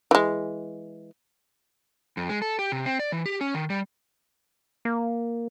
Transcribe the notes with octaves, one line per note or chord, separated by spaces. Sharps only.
E3 G#3
F2
G#3
A4
G4
C3
C4
D5
E3
G4
C#4
D#3
G3
A#3